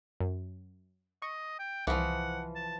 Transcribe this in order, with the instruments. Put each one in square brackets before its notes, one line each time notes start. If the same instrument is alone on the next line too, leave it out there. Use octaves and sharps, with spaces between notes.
[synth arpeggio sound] F#2
[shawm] D#5 [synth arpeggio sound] C#6
[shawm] G5
[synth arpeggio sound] C2 [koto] E3 F3 [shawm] F#5
[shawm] A5